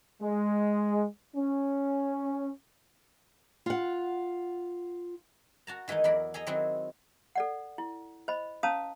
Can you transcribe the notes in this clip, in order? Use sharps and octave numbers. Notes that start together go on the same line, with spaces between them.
G#3
C#4
F4 F#5
F#4 A5 A#5
D#3 E3 G#3 A3 D#4
E2 F#3 E4 A#4 D5 B5
G#4 A4 D#5 A#5
D#3 F#3 G#3 C4 E4 F#4
A4 D5 F#5
E4
C5 D#5 B5
C#4 C5 F5 A5 A#5 D#6